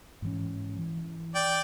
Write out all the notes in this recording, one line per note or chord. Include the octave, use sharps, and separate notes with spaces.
G#2 E3 C#4
E3
D5 G5